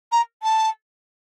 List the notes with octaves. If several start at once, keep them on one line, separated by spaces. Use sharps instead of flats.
A#5
A5